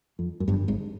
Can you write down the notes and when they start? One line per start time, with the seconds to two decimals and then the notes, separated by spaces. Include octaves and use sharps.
0.19 F2
0.40 F#2
0.48 G1 G2
0.68 G#1 G#2